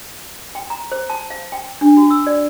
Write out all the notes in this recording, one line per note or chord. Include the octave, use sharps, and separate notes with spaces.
G5
A#5
C5
A5
F5
G5
D4
F#4
E6
D5